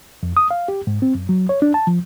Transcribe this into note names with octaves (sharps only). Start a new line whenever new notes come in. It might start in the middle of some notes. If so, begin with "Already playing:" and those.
F2
D#6
F5
G4
G#2
C4
F#2
F#3
C#5
D4
A5
F3